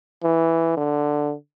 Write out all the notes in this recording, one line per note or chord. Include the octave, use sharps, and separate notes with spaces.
E3
D3